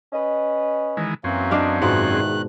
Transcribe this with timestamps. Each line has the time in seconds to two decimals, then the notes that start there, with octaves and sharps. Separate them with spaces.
0.13 C#4 B4 D#5
0.97 D#3 E3 G#3
1.24 F#2 E3 F#3 A#3 C4 C#4
1.51 D4 D5 D#5 F5
1.82 E2 G#2 B2 D#3 F4 F#6